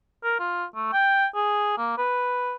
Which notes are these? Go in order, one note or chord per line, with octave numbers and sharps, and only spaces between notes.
A#4
F4
A3
G5
G#4
A#3
B4